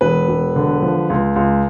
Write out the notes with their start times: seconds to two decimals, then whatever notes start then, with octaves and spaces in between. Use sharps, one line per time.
0.01 E1 B4
0.28 E1
0.56 D3
0.82 F3
1.10 C#2
1.36 C#2